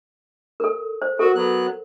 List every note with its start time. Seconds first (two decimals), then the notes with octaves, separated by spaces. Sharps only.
0.60 A4 A#4
1.02 C5
1.19 F#4 A4 A#4
1.35 F#3 B3 F#6